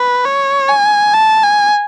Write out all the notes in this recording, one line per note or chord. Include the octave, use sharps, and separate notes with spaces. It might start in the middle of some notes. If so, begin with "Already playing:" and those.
Already playing: B4
C#5
G#5
A5
G#5